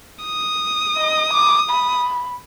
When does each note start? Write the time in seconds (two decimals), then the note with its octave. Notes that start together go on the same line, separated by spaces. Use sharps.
0.25 D#6
0.97 D#5
1.33 D6
1.70 B5